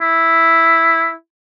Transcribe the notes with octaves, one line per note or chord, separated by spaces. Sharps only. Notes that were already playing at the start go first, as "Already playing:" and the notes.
E4